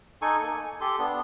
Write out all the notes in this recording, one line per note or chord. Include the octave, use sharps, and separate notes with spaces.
D#4 A4 G#5 C#6
A#3
G#5
G4 A4 C6
B3 D4